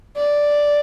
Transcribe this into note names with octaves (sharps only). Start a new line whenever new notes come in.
D5